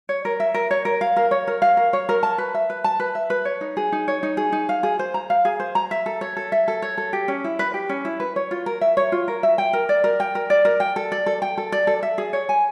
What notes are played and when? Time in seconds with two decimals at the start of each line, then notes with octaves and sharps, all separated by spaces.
0.09 C#5
0.25 A#4
0.40 E5
0.54 A#4
0.71 C#5
0.85 A#4
1.01 F5
1.16 A#4
1.31 C#5
1.48 A#4
1.62 F5
1.77 A#4
1.93 C#5
2.09 A#4
2.23 A5
2.38 B4
2.54 E5
2.70 B4
2.84 A5
3.00 B4
3.15 E5
3.30 B4
3.45 C#5
3.61 D#4
3.77 G#4
3.92 D#4
4.08 C#5
4.23 D#4
4.37 G#4
4.52 D#4
4.69 F5
4.83 G#4
4.99 C5
5.14 A#5
5.30 F5
5.45 G#4
5.60 C5
5.75 A#5
5.91 E5
6.06 A4
6.21 C#5
6.37 A4
6.52 E5
6.68 A4
6.82 C#5
6.98 A4
7.13 G4
7.28 C#4
7.44 E4
7.59 B4
7.74 G4
7.89 C#4
8.05 E4
8.20 B4
8.36 C#5
8.51 F4
8.66 A#4
8.81 E5
8.97 C#5
9.12 F4
9.28 A#4
9.43 E5
9.58 G5
9.73 A#4
9.89 D5
10.04 A#4
10.20 G5
10.35 A#4
10.50 D5
10.65 A#4
10.80 G5
10.96 A4
11.12 D5
11.26 A4
11.42 G5
11.58 A4
11.72 D5
11.87 A4
12.03 E5
12.18 G#4
12.33 C#5
12.49 G#5